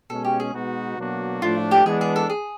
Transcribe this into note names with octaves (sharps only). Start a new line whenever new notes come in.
B2 G#3 C#4 A4
G4
G#4
B2 G#3 B3 D#4 F#4
B2 F#3 A#3 D4 F#4
A2 F3 A3 D4 F4
G4
E3 G#3 B3 D4 G#4
G#4
A4
G#4